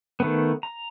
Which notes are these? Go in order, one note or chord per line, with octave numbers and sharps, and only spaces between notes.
D#3 A3 B3
A#5